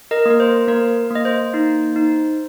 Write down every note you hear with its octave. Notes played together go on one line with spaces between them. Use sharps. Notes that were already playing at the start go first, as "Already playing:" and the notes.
A#4 D#5
A#3 A#4
C5
A#3 A#4
A#3 D#5
C5
D#4
D#4